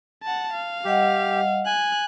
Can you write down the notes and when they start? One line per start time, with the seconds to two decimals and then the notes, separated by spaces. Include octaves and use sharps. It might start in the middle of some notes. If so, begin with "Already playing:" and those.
0.23 F#5 A5
0.53 F5
0.85 G3 G4 D#5 F#5
1.66 G#5 F#6